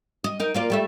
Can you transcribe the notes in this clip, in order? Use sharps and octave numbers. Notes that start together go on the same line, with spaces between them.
D#5
D#4 A#4
A#3 F4 D5
G3 A3 E5